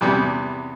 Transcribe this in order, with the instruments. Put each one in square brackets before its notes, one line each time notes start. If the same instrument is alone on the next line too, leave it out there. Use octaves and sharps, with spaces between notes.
[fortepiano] E2 C3 G3 B3